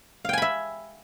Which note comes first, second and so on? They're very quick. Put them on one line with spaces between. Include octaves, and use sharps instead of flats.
F5 G5 G#5 B5 E5